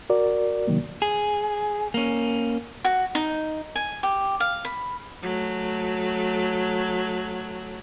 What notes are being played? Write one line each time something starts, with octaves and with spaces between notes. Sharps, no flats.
F#4 A#4 D5
C3 D#3 F#3 A#3
G#4
A#3 C#4
F#4
D#4
G#5
G4
F5
B5
F#3 A3